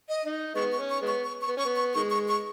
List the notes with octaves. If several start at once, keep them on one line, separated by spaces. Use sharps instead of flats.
D#5
D#4
G#3 B3 C#6
C#6
C#4
C#6
G#3 B3
C#6
C#6
C#6
B3
C#4 C#6
B3
C#6
D#3 G#3 C#6
C#6
C#6